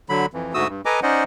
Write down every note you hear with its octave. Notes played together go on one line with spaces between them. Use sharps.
D3 F#3 B5
F2 E3
D2 G#2 A3 F#4 D#6 E6
G2
A4 B4 D#5 G#5 A#5 D6
C#4 D#4 C5 D5 D#5 F#5